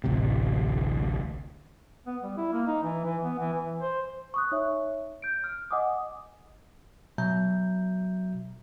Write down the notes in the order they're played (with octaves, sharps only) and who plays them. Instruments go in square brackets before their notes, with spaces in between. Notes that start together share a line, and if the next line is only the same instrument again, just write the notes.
[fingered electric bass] D1 A1 D2 C3
[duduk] B3
G3
E4
A#3
D#4
E3
E3
B3
E3
E3
C5
[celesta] C#6 D#6 F#6
D#4 C#5 E5
G6 D7
F6
D#5 F#5 G#5 D6 D#6
[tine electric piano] B2 F#3 E5 A#5 G6